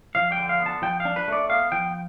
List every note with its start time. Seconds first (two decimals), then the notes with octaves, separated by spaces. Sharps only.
0.15 F3 F5
0.32 G5
0.37 D3
0.49 F5
0.60 B3
0.66 A5
0.82 F3 G5
1.00 F5
1.05 D4
1.16 B4
1.28 A3 D5
1.49 B3 F5
1.72 F3 G5